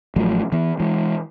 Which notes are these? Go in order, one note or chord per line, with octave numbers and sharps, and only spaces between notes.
A1 F3 F#3 A3
E3 B3
E3 G#3